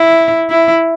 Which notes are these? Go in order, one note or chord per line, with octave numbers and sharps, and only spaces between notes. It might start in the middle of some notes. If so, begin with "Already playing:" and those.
Already playing: E4
E4